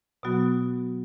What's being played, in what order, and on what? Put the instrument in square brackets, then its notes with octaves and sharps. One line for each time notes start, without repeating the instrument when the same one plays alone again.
[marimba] B2 F#3 B3 F#4